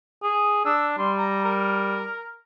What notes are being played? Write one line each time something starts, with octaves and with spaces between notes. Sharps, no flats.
G#4
D4 E6
G3 C6
A#5
A#4